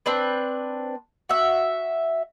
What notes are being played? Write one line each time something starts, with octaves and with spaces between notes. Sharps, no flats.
C4 D4 B4
F#4 E5